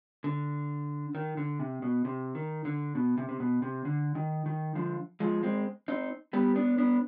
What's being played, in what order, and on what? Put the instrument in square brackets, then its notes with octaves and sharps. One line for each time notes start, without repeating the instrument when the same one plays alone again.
[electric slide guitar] D3
D#3
D3
C3
B2
C3
D#3
D3
B2
C3
C3
B2
C3
D3
D#3
D#3
D3 F3
F3 G#3
G#3 C4
C4 D#4
G3 B3
B3 D4
B3 D4